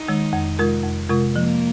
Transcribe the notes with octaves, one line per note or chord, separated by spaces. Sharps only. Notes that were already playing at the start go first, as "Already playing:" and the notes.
Already playing: D#4
D#3 G#3
F2
C3 G#3 F4 A#4
F2
C3 G#3 F4 A#4
F3 A#3